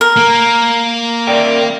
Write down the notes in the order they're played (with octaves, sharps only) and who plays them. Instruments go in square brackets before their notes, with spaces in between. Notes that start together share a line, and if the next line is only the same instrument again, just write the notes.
[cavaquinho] A#4
[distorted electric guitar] A#3
[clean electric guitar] A#4 D5 G5